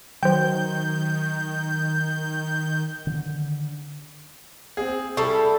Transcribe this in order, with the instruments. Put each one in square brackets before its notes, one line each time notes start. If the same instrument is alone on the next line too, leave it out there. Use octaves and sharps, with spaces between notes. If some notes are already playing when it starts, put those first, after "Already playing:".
[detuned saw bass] D#3 [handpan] F#3 [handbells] C5 G5 [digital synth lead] G6
[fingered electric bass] D3 D#3
[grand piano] C4 G#4
[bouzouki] G3 E4 A4 [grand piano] C#6 C7